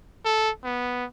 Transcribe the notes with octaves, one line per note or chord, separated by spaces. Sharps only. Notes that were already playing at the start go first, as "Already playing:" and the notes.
A4
B3